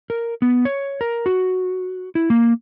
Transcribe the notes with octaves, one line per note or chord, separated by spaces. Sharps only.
A#4
B3
C#5
A#4
F#4
E4
A#3